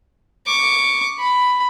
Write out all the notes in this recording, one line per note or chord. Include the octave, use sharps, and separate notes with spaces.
C#6 D6
B5